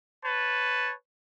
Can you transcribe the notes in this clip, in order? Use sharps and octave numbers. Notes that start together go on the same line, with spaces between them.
B4 C#5 A5